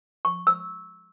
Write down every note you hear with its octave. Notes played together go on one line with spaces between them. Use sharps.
C#6
E6